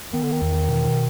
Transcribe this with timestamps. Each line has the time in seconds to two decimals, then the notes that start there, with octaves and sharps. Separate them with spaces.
0.13 D#3 B3
0.23 D3
0.32 D#3
0.41 E2
0.68 B2